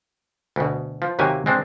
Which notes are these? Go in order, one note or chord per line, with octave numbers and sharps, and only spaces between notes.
D2 B2
F3
D#2 C3 F#3 A#3 G4 G#5
G#3 C4 D4